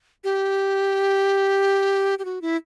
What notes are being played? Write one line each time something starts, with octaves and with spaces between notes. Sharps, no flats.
G4
G4
F#4
E4